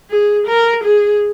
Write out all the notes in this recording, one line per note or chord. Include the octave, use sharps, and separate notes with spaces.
G#4
A#4
G#4